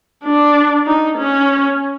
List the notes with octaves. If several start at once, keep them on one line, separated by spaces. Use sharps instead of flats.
D4
D#4
C#4